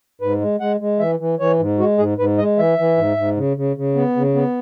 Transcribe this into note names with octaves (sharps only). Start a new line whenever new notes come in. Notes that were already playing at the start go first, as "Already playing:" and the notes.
G#2 B4
G#3
G#3 F#5
G#3
E3 E5
E3
E3 C#5
G#2
G#3 F#4
G#2 G#4
G#2 B4
G#3 D#5
E3 E5
E3
G#2
G#2
C#3
C#3
C#3
B3
C#3
B3